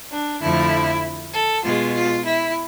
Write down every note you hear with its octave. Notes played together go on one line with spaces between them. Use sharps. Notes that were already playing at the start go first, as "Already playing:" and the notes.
D4
F2 D3 F3 A3 E4
A4
B2 G#3 F4
F4
E4